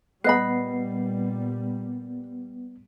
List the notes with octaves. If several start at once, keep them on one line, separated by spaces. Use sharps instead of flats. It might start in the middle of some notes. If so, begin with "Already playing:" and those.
A#2 G3 B3 B4 D#5 B5 C7